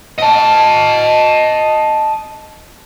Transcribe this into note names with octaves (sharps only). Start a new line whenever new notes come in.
D#5 A5